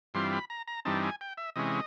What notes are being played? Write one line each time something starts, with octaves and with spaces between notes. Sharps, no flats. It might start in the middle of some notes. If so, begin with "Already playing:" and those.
G2 E3 G3 C4 F4 C6
B5
A#5
A#5
G2 E3 G3 C4 D#4 A5
G#5
G5
E5
C3 E3 G#3 C#4 D#5